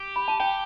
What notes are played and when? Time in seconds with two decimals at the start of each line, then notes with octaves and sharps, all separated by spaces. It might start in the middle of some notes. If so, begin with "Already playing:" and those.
Already playing: G4
0.16 B5
0.28 A5
0.40 G4 G5